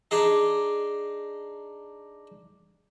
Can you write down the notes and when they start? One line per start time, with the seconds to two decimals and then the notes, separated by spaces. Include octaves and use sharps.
0.11 D4 D#4 G#4 D#5